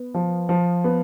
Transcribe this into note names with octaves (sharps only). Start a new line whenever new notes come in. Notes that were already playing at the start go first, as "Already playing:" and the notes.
Already playing: B3
F3
F3
B3